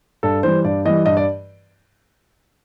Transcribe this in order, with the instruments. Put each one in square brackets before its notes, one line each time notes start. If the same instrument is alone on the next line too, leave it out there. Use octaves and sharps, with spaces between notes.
[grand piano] G2 A4
E3 G3 C5
G2 D5
E3 G3 D#5
G2 D#5
D5